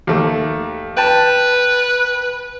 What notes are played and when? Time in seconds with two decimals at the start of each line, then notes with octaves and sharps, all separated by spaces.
0.07 D#2 A3
0.97 B4 G5 A5